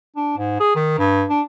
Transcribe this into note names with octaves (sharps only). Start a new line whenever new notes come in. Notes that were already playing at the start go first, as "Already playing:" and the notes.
D4
G#2
G#4
D#3
G2
D4